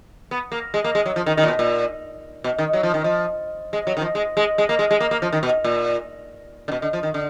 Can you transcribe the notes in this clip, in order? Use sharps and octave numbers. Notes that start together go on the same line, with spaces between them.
B3
A#3
G#3
A#3
G#3
F#3
F3
D#3
D#3
A#2
B2
A#2
B2
D#3
F#3
F3
D#3
F3
G#3
F#3
D#3
F3
G#3
G#3
G#3
A#3
G#3
G#3
A#3
A#3
F3
D#3
B2
A#2
D3
B2
D3
F3
D#3
D3